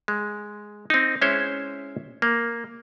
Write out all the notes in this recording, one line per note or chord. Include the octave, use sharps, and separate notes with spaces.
G#3
C4 D#4
G#3 C#4 E4 C5 C#5 E5
A#3